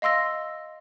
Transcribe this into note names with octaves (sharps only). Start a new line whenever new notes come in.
D#5 F5 C6 E6 A#6